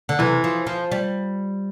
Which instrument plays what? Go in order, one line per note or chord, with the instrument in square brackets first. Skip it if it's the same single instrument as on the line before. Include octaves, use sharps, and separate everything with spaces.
[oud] D3
[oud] C3 [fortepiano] E3
[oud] F3
F3
G3